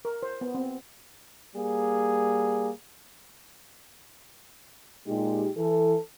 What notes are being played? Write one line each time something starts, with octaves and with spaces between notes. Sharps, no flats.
A#4
C5
B3
C4
G3 A#3 G#4
A#2 G#3 D#4 G4
E3 A4